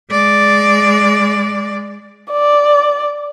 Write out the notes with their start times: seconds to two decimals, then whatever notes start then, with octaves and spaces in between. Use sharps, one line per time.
0.11 G#3 D5
2.31 D5